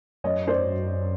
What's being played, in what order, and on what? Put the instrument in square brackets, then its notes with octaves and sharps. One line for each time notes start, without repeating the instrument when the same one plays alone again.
[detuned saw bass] F#2 [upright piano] C#5 D#5
[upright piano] C5 D5